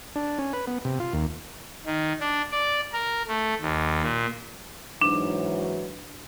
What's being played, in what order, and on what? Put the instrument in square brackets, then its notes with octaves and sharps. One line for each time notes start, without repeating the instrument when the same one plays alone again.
[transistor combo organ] D4
C#4
B4
B3
C3
F4
D#2
[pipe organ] D#3
D4
D5
A#4
A3
D#2
A#2
[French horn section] G#2 E3 F#3 [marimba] D4